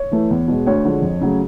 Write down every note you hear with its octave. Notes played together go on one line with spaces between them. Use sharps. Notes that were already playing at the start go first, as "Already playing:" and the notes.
Already playing: C#5
E3 A3
E2
B2 G#3
D2 C#5
D3 F3 G#3
F2
C#3 F#3 A3